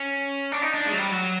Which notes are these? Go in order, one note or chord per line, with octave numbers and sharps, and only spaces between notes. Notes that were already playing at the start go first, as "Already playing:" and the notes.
Already playing: C#4
D4
D#4
D4
G#3
F#3
G3
F#3